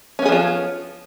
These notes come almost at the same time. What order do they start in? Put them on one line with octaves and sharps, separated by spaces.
C#4 B3 G#4 F3 F4